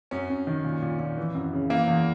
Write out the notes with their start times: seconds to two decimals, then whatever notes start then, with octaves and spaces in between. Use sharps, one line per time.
0.11 F#2 C#4
0.30 F#2
0.47 D#3
0.64 A#2
0.82 A#2
0.99 A#2
1.17 E3
1.35 F#2
1.53 C#3
1.70 E3 A#3
1.88 E2